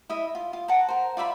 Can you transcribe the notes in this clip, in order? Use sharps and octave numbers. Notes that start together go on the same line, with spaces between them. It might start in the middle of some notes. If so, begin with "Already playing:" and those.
E4 D#5 E5
F4
F4
F#5 A5 A#5
A#4 C5
F4 D5 E5 B5